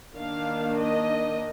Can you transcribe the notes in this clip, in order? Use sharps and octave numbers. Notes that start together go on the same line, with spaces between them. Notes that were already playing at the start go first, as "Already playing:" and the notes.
D#3 A#3 D4 F5
D#5